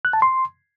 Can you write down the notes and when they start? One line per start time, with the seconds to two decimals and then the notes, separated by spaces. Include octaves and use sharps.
0.05 F#6
0.13 A5
0.22 C6